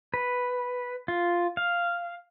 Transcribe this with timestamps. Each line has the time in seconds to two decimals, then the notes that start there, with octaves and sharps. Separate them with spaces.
0.14 B4
1.08 F4
1.57 F5